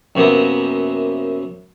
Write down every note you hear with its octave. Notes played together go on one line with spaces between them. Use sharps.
F#2 C3 A#3 B3